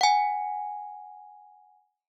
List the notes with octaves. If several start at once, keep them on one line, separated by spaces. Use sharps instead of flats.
F#5 G#5